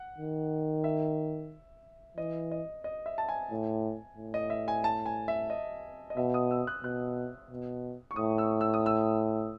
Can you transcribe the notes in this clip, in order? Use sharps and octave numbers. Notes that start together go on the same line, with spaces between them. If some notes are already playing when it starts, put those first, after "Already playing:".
Already playing: F#5
D#3
E5
E3 D#5
D#5
D#5
E5
A5
G#5
A2
A2
D#5
E5
G#5
A5
G#5
E5
D#5
D#5
B2 E5
D#6
E6
F#6
B2 F#6
B2
C#6
A2 D#6
E6
E6
D#6
E6